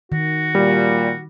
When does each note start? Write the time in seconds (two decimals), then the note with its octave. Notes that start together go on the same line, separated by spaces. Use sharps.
0.12 D#3 F#4
0.55 A#2 G3